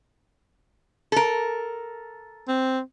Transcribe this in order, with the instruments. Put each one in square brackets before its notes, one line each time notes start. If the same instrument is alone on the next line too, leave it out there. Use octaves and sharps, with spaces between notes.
[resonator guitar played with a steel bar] A4 A#4
[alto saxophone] C4